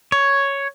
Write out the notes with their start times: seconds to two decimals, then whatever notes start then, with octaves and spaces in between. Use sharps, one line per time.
0.12 C#5